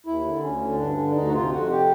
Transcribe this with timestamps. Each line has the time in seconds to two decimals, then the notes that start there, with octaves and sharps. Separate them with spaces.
0.06 D#2 E4
0.25 D3
0.43 D2 C#4
0.60 D3
0.79 G2 D4
0.97 D3
1.15 D2 D#4
1.27 F#4
1.34 C3 F4
1.51 F2 F#4
1.70 C3 G4